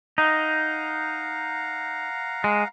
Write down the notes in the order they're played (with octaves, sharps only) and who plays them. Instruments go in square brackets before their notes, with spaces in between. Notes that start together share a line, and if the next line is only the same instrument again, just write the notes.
[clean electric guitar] D#4 [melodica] F5 F#5 A#5
[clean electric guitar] G#3